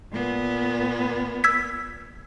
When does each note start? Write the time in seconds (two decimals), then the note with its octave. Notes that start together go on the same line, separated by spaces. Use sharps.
0.12 A#2 B3
1.44 E6 G#6 B6